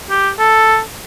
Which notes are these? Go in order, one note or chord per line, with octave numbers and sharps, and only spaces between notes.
G4
A4